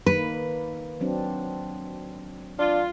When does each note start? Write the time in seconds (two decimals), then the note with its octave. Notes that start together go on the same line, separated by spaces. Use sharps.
0.06 D#3 A#3 B4
1.01 F#3 C4 D4
2.59 D4 F4